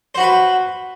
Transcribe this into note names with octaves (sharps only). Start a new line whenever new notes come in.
F#4 B4 C5 B5